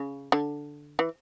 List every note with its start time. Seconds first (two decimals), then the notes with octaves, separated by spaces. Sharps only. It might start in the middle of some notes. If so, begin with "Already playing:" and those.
Already playing: C#3
0.32 D3
0.99 E3